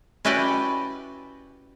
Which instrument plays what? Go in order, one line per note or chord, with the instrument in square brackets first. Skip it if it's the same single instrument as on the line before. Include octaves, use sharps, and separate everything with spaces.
[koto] C#4 E4 F#4 G4 B4 D5